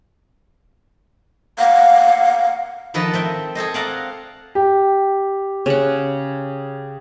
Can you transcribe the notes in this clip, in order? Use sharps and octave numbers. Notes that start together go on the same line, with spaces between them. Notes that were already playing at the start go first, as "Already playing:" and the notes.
F5 F#5
D#3 F3 A4 B4 D#5
C4 E5 G5
G#4 A4 C5 D#5
C4 D5 F5 F#5 A5 A#5
G4
C#3 F#5